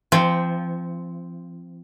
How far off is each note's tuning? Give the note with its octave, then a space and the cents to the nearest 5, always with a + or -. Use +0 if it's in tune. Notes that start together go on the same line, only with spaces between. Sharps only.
F3 -30 C4 -5